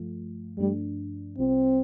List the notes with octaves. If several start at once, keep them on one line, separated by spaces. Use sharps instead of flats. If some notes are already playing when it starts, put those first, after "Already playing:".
Already playing: G2 F3 A3 F4
G2 F3 G3 A3 D4
C2 C3 G3 C4 F4